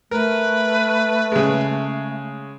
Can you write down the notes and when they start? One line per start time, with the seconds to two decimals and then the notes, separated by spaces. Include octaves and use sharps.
0.11 A3 A#4 B4
1.32 C#3 G#3